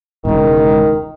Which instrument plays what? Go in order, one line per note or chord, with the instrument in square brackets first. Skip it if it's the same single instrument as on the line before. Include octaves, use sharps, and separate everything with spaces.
[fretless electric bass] E1 C#2 [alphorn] D#3